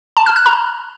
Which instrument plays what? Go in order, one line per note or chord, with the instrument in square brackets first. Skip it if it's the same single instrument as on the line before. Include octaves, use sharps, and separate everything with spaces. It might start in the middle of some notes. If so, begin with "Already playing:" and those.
[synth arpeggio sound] A5
F6
F#6
A#5